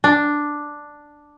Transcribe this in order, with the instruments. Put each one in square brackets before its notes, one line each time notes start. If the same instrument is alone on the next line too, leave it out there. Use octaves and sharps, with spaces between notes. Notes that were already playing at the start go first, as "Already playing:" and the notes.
[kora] D4